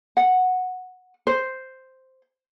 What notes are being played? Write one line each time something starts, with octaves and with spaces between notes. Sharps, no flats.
F#5
C5